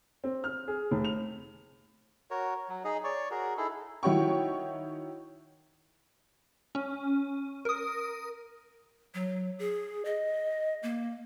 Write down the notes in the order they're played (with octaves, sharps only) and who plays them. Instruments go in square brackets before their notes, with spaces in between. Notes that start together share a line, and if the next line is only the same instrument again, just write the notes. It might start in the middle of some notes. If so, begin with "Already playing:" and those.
[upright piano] C4
F6
G#4
F1
F7
[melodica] F#4 A#4 C#5
F#3
D#4 G#4 D#5
C#5 D5 C#6
F#4 G#4 A#4
D#4 E4 G#4 A4
[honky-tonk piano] D#3 E4 F#4 C#5 G5 C#6
[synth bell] C#4
A#4 D#6
[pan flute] F#3
G#4
D#5
A#3